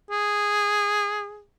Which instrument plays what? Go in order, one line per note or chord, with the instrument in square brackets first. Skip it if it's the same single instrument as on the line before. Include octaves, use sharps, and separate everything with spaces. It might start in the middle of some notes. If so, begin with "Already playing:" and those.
[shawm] G#4